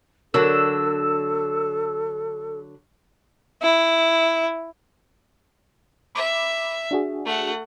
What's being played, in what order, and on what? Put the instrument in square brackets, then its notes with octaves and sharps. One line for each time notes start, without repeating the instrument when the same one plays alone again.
[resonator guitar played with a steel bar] D3 F#3 [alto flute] A4 [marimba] A#4 [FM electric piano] E6
[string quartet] E4
[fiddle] E5 [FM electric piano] B5 D6
[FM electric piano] D4 F#4 G#4
[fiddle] A3 F#5